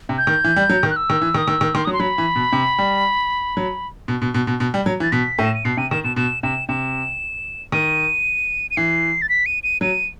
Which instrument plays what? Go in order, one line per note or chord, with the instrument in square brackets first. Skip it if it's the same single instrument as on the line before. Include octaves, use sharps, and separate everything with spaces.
[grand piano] C3
[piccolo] G6
[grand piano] D#3
E3
G3
F#3
D#3
[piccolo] F#6
E6
[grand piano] D#3
E3
D#3
[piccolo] D#6
[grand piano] D#3 [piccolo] E6
[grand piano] D#3
[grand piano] D#3 [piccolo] C6
[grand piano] F#3 [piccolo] D#6
[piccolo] C6
[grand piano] F#3 [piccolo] B5
[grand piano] E3
B2
C3
G3
F#3
B2
B2
B2
B2
B2
G3
F#3
E3
[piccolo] A6
[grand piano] B2 [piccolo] B6
[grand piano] A2
[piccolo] E7
D#7
[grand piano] B2 [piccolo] C7
[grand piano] C3 [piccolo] D#7
[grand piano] D#3 [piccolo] E7
[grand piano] B2 [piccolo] E7
[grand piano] B2 [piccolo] E7
[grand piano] C3 [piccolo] E7
[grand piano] C3 [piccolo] E7
[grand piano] D#3 [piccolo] D#7
[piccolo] D#7
[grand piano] E3 [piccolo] C7
[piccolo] A6
B6
D#7
D#7
[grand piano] F#3 [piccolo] D#7